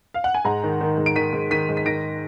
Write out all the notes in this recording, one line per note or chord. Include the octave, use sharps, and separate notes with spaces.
F5
F#5
G#5
G#2 F#5 A#5
D#3
D#3
G#2
D7
D#3 B6 D#7
G#2
D#3 B6 D#7
G#2
B6
D#3 A#6 D7